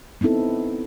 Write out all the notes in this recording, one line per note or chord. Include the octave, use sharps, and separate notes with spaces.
B3 C4 D#4 E4 A4